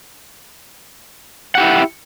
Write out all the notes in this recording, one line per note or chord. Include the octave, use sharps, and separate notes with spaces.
E4 G4 F#5